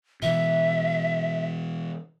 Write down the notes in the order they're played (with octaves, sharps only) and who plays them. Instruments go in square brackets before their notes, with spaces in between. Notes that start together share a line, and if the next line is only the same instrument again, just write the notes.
[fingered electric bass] B2 E3 [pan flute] E5